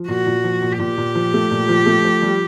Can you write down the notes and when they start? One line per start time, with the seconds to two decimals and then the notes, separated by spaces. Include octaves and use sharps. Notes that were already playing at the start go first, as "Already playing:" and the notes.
Already playing: F3
0.08 A#2 F#4
0.26 A#2
0.44 F3
0.62 A#2
0.79 A#2 G4
0.97 A#2
1.15 F3
1.33 A3
1.51 A#2
1.69 F3
1.86 A3
2.05 F3
2.22 G3